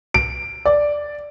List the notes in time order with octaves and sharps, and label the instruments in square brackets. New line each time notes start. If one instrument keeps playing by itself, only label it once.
[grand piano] D7
D5